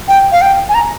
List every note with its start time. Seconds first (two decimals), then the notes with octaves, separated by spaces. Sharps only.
0.08 G5
0.32 F5
0.42 G5
0.69 G#5
0.75 A#5